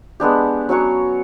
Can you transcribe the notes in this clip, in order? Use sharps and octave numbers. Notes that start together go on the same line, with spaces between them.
G#3 B3 D4 G4
F#3 C#4 F#4 C#5